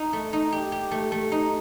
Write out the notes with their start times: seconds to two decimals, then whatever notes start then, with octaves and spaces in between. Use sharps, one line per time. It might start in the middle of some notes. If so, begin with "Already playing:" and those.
Already playing: D#4
0.13 A3
0.33 D#4
0.52 G4
0.72 G4
0.91 A3
1.12 A3
1.32 D#4